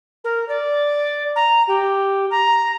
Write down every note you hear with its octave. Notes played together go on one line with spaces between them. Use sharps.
A#4
D5
A#5
G4
A#5